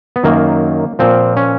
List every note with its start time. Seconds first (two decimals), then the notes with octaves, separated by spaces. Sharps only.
0.16 B3
0.23 F#2 D#3 F#3 A#3
0.99 A#2 F3 C4
1.37 C#4